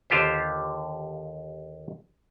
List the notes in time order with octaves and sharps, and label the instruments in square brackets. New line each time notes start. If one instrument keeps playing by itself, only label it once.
[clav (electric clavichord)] D#2 D3 F4 G4 C5